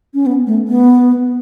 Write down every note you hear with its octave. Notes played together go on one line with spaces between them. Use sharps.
C#4
B3
A3
B3